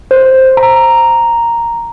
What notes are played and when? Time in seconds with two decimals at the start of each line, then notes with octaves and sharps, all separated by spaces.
0.11 C5
0.57 A#5